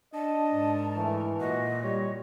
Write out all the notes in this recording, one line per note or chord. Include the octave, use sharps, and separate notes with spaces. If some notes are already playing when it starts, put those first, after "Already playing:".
D4 D#5 A5
G#2 A#4
E3 A3
A#2 F#4 D#5
G3 C#5